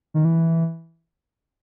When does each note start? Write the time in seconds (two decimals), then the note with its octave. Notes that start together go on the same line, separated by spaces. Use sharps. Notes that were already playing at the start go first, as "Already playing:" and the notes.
0.14 D#3
0.25 E3